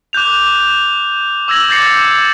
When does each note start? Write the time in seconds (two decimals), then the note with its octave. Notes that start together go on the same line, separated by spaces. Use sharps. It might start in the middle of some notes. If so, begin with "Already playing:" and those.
0.13 D6 F#6 G6 F7
1.48 D6 E6 G#6 A#6 F#7
1.69 D6 G6 A6 A#6 C7 C#7